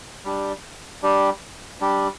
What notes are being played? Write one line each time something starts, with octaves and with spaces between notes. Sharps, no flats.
G3 D4 G4
G3 D4 G4
G3 D4 G4